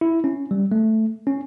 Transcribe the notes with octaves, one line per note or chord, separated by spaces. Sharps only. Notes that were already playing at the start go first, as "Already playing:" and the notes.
E4
C#4
G3
A3
C#4